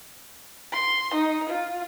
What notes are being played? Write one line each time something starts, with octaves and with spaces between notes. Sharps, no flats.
C6
D#4
F4